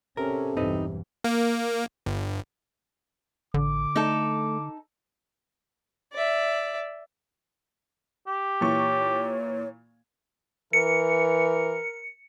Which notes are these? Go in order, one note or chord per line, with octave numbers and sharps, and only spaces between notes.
C3 C#4 A4 A#4
B1 E2 G2 C4 D#4 B4
A#3
G1
A1 D3 D6
A3 D#4 A4
D5 E5
G4
A#2 E3 C#5 C#6
E3 A#4 C#7